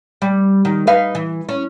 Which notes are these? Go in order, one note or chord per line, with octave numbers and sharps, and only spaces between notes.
G3
D#3
D#4 B4 F5
E3
C#4